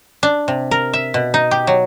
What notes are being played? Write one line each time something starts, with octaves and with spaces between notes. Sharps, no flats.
D4
C3
A#4
E5
B2
D#4
G4
F#3